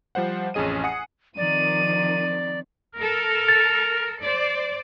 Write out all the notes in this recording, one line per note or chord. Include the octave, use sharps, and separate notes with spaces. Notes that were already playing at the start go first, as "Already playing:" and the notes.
F3 G3 C5 F#5
A1 F2 C#4 G#4 D#5 D#7
F#5 G#5 D#6 C7 C#7
D#3 F3 C4 D5 D#7
A4 A#4 F6
A6
C5 D5